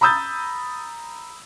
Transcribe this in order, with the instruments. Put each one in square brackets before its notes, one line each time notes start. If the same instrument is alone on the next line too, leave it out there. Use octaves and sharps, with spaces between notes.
[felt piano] A#5 B5 D#6 E6 G6 A6